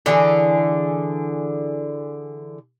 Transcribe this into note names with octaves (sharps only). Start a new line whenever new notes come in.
D3 E3 D4 G#4